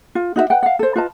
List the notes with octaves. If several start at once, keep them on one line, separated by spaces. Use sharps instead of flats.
F4
D#4 F#4 B4 E5
B4 F#5 G5
F5 F#5
A4 C5
F4 B4 D#5 A5